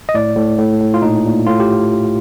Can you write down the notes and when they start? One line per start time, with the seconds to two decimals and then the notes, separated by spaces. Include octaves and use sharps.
0.09 D#5
0.14 A2 D5
0.37 A2
0.58 A2
0.81 A2
0.94 F4
1.02 A#2 D#4
1.25 A#2
1.46 A2 F4
1.60 G4